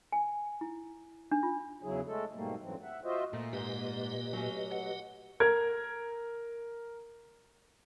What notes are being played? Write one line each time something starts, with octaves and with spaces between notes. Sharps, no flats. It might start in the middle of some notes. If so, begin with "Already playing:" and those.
G#5
E4
D4
F4
E2 C#3 F#3 E4 G#4
G#3 A3 A4
G#2 B2 G3 A3 A#3
F2 G#2 D3 E3 F#3 C4
E5 F#5
F4 F#4 C5 D#5 E5
A#2 A3
G#2 G4 B4 D#5
F#3 A3 C#4
F#5
A#4 G#6